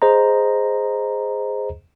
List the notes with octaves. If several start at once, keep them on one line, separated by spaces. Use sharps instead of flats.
G#4 C5 D#5 A#5